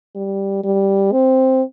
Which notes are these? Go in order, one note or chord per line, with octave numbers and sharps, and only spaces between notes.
G3
G3
C4